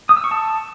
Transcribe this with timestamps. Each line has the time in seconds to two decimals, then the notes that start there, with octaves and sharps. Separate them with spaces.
0.09 D#6
0.17 E6
0.24 C#6
0.31 A5